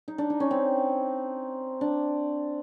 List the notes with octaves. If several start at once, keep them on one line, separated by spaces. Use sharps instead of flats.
D#4
D4
D#4
C#4
C4
D4